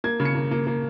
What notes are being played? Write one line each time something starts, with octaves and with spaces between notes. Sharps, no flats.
A#3 G#6
C#3
C#7
A#3
A#3
A#3